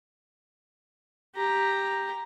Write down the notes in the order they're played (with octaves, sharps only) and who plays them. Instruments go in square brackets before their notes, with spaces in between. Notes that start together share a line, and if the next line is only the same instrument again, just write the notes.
[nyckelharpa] G4 A#5